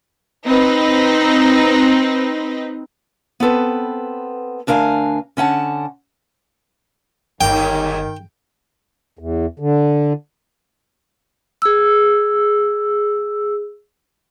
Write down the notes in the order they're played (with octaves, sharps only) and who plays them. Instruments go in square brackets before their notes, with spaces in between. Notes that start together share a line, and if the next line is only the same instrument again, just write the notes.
[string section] C4 D#4 B4
[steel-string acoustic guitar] B3 C4 A4 B4
D2 D4 A#4 F5 G#5
D3 C#4 F#5 A5
[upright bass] G1 [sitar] D#2 G#2 [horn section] D#3 [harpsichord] G5
[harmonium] E2
D3
[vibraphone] G#4 E6